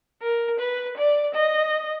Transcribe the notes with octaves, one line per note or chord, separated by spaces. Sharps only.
A#4
B4
D5
D#5